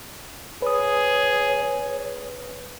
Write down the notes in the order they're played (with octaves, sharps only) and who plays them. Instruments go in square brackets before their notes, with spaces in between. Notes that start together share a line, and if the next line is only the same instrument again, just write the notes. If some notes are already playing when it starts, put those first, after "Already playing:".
[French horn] G#4 [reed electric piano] B4 D#6 [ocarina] C#5